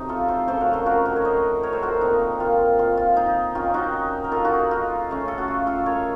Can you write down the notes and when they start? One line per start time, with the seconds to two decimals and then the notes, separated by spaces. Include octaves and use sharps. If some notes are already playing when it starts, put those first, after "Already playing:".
Already playing: C3 F#3 A3 D#4
0.09 F4 A4
0.28 A4 C5
0.48 C#3 F3 A3 A4 C5
0.61 F#4 A#4
0.73 F4 A4
0.86 F#4 A#4
1.05 F#4 A#4
1.16 C#5
1.25 C5 D#5
1.63 A#4 C#5
1.73 A4 C5
1.82 F#4 A#4
2.01 A#2 F3 C4 D#4
2.40 F4
2.79 F4
2.97 F4
3.16 D#4
3.55 D#3 A#3 C#4 F4
3.74 D#4 F#4
4.24 A#4
4.32 F4 A4
4.45 D#4 F#4
4.71 F4
5.10 C#3 A3 C#4
5.28 A4
5.38 F#4
5.48 F4
5.67 F4 A4
5.86 A#4 C#5